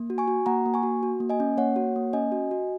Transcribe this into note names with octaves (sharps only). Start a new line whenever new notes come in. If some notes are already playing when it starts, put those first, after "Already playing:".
Already playing: A#3
F#4
G#5 C#6
F#4
A#3 F#5 A#5
A#3
G#5 C#6
F#4
F#4
A#3
D#5 G#5
C#4
A#3 C#5 F#5
F#4
A#3
C#4 D#5 G#5
F#4
F#4